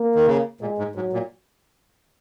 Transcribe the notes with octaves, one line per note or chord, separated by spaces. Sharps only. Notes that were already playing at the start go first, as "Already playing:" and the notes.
Already playing: A#3
D#3
C#3
A#2 G#3
G#2
G#2 F#3
A#2